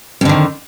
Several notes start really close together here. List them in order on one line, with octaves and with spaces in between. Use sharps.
F2 D3 D#3